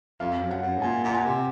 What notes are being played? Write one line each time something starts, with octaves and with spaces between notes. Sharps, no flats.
F2 F5
F#2
F#5
F#2
G#2
A#2 G#5
A#2 F#5
G#5
C3